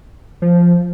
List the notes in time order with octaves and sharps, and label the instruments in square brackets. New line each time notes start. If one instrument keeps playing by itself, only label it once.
[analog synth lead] F3